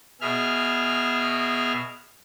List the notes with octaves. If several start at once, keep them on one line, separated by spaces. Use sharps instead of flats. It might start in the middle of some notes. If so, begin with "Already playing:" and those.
B2 G#4 E5 F6